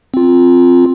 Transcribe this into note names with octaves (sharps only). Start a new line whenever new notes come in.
C4 F4